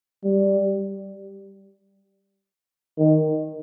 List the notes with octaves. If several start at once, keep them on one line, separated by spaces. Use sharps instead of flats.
G3
D#3